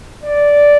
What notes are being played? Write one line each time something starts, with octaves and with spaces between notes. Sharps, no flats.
D5